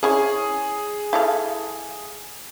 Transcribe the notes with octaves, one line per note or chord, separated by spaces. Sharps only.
C#4 E4 G#4 C#5
E4 A4 F5